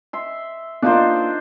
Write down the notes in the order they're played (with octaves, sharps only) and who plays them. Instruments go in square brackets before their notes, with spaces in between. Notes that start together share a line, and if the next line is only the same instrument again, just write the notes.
[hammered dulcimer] E5 C6
[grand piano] A#3 F4 F5 [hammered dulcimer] D4 D#4 C5